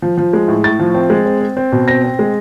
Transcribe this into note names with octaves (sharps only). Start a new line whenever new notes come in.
F3
F3
G#3
A2
A2 A6
F3
C4
G#3
C4
C4
C4
B2
C4 A#6
C4
G#3